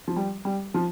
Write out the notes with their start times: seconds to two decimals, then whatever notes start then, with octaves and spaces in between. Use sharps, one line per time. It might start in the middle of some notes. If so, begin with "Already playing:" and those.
0.08 F3
0.16 G3
0.45 G3
0.74 F3